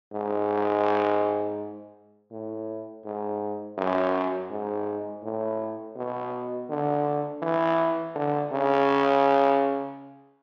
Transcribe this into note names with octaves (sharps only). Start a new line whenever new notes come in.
G#2
A2
G#2
F#2
G#2
A2
B2
D3
E3
D3
C#3